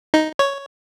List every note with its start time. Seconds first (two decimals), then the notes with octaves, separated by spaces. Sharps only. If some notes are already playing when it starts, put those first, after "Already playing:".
0.14 D#4
0.39 C#5